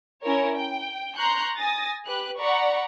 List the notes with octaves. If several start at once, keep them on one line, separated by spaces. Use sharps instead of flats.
C#4 E4 A#4 C#5
G5
A#5 C6 C#6 F#6 G6
G#5 D#6 A6 A#6
G4 B4 F#6
D5 F#5 A#5 B5 C#6